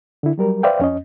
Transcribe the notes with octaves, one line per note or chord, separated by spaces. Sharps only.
D3 E4
F#3 G3 A#4
B4 C5 D5 E5 F5 G5
F2 C#4 D#5